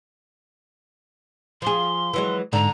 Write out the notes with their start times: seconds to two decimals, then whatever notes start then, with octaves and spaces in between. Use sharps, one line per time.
1.62 F3 G#4 C6
2.14 E3 F#3 G#3
2.53 G#2 D3 A#5